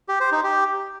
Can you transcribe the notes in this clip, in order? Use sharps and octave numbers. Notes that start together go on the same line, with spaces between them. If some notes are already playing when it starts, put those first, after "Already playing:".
G4
C5
D#4
G4